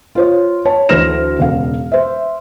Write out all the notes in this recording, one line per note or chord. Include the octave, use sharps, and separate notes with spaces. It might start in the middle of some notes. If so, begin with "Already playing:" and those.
F4 C5 C#5
C#5 A5
D2 E3 C5 F6 A#6 E7
E1 C#3 F5
C5 E5